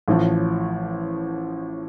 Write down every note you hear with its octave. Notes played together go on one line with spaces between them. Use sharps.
A1 A2 F3